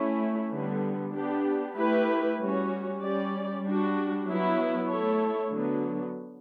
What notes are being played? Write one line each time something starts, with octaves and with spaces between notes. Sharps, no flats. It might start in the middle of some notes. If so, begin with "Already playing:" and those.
Already playing: A3 C#4 E4
D3 G3 B3
B3 D4 G4
A3 E4 G4 B4
G3 C#4 F#4
G3 C#4 G4 D5
G3 D4 F#4
F#3 B3 E4
A3 E4 A4 C#5
D3 F#3 B3